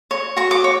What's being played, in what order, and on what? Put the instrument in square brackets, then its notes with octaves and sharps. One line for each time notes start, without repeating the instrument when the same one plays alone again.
[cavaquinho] C#5
F#4 C#6
D6
C#5